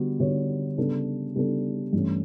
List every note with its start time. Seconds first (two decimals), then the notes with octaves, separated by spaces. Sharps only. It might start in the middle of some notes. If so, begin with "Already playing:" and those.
Already playing: D3 G3 B3 F#4
0.19 D3 G3 B3 F#4 C#5
0.78 C#3 G3 B3 D4 A4
1.36 C#3 G3 B3 D4 A4
1.93 G2 E3 A3 C#4